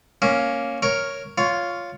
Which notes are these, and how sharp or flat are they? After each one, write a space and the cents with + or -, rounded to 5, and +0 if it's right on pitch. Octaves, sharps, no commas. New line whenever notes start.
A#3 +0 C#4 +0
A#4 +0 C#5 +0
F4 +0 C#5 +15